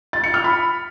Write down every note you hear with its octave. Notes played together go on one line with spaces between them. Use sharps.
A6
C#7
F6
B5